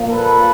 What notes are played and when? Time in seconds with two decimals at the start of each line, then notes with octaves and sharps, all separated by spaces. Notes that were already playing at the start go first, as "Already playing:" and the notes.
Already playing: A#2 F3 A#3
0.10 A4 B4